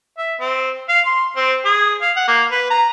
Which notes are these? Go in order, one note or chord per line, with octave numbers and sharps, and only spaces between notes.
E5
C4
F5
C6
C4
G#4
F5
F#5
A#3
B4
A#5